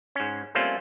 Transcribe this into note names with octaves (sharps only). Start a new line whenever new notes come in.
G#2 C#4
G3 A3 A#3 C4 C#4 F4